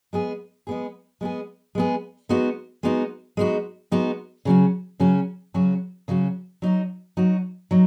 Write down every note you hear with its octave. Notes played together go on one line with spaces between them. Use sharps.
G#3 B3 G#4
G#3 B3 G#4
G#3 B3 G#4
G#3 B3 G#4
G#3 B3 D#4 F#4
G#3 B3 D#4 F#4
G#3 B3 D#4 F#4
G#3 B3 D#4 F#4
C#3 F#3 C#4 F#4
C#3 F#3 C#4 F#4
C#3 F#3 C#4 F#4
C#3 F#3 C#4 F#4
F#3 D#4 F#4
F#3 D#4 F#4
F#3 D#4